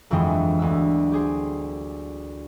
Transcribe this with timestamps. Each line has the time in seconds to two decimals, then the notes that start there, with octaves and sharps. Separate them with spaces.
0.10 G1 F2 E3 F#3 G#3 G5
0.59 D2 B3 E6
1.12 G4 G#4 C5